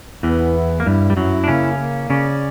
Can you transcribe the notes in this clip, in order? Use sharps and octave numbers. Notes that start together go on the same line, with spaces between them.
E2 E3 B3
E4
A#3
G2 G3 E4
G3
F#2 F#3 E4
D4
C#3 A#3 C#4
A#3
C#3 C#4 D5